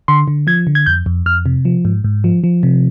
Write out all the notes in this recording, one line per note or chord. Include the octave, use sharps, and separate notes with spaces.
D3 C6
D3
F3 G#6
D3
G#6
F2 G6
F2
F2 F6
C3
F3
G#2
G#2
F3
F3
C3